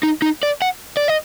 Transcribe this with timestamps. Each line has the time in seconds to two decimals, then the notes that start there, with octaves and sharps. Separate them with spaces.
0.03 D#4
0.22 D#4
0.43 D5
0.62 F#5
0.97 D5
1.08 D#5